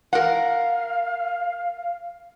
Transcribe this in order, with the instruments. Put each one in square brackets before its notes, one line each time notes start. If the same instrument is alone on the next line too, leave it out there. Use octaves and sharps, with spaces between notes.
[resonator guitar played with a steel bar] A#4 F#5 [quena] F5